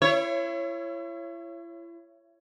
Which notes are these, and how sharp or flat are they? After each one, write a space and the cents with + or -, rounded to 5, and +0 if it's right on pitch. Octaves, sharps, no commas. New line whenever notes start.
E4 +40 C#5 -10 E5 +25